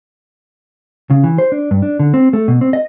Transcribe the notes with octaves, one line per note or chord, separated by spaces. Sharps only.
C#3
E3
C5
D4
G2
D4
D3
C4
A3
B2
C4
D#5